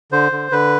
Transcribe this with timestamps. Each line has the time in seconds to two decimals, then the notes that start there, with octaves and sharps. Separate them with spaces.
0.12 D3 C5
0.32 D3
0.52 D3 B4